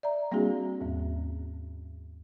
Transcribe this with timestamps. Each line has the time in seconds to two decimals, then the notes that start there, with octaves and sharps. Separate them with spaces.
0.03 D5 E5 A#5
0.32 G3 A#3 C4 D4 F#4 G#4
0.81 D#2 G#2